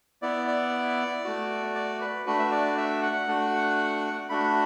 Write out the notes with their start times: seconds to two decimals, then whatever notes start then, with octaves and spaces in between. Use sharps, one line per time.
0.22 B3 E4 D5
0.47 D5
1.24 A3 F#4
1.75 D5
2.01 B4
2.26 A3 D4 F#4 B4
2.39 E5
2.51 D5
2.77 E5
3.02 F#5
3.28 A3 D4 F#4
4.29 A3 D4 F#4 B5